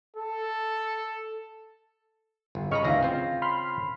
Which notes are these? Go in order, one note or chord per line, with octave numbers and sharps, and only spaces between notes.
A4
G1
C#3 B4 D#5 A#5 C#6 F6
D2 E3 G#4 F5 A#6
C#3 C4 F4
B5 C6 F6